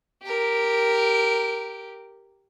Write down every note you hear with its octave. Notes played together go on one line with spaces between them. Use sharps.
G4 A#4